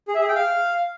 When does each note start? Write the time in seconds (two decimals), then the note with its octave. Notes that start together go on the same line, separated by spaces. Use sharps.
0.08 G#4
0.15 E5
0.22 G#4
0.28 G5
0.35 F5